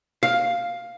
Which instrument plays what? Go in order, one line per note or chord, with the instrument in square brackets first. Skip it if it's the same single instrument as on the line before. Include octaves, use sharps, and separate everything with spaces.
[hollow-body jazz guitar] F5